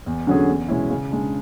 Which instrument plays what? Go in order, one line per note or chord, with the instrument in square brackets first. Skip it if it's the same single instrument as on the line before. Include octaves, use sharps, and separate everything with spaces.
[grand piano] E2
D3 F#3 C#4 G#4
E2
B2 G#3 C#4 E4
C#3
G#3 D4